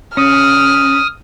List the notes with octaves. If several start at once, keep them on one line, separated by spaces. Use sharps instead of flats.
C#4 D#6 F6